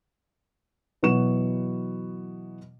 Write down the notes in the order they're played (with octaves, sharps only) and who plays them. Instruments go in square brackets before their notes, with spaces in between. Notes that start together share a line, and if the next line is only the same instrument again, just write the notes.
[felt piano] B2 E3 F#3 B3 C#6 E7